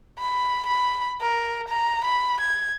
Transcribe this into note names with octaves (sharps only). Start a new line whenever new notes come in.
B5
B5
A#4
A#5
B5
G#6